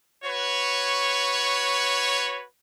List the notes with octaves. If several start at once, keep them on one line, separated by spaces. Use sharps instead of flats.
F#4 B4 C#5